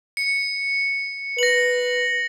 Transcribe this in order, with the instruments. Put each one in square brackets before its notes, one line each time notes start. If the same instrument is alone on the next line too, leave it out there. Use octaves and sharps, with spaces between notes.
[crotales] C#7
[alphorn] B4 [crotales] A#6 F#7